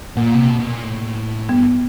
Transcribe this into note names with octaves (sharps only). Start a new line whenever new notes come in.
A#2 A#3
C3
B2
B2
A#2
A2
G2 B3